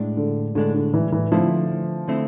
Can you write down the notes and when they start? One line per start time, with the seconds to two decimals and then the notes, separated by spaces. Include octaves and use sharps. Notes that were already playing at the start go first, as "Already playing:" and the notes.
Already playing: A2 G#3 D4
0.17 D3
0.55 A2 D3 G#3 D4
0.74 D3
0.94 E3
1.12 E3
1.32 D3 F3 A3 C4 E4
2.08 D3 A3 C4 E4